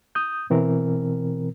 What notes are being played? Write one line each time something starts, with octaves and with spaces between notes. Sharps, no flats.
D#6 G6
B2 E3 C4 A#4